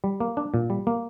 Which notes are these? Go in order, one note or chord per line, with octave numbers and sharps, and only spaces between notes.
G3
A#3
D4
A#2
G3
A#3